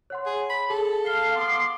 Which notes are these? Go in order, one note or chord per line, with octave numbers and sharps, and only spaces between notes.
C#5 F#5 C6
G#4
B5
G#4 A4
F5 C7 G7
B3 C6 D6